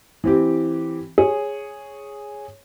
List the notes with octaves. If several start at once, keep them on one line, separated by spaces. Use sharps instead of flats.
E3 C4 G4
G#4 C#5